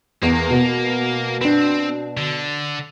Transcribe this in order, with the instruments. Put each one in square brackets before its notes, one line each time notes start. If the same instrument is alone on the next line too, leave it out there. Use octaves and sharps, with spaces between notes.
[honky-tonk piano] E2 [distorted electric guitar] A#3
[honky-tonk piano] B2 B3
[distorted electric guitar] C4 [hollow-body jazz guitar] D4 B4
[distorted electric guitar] D3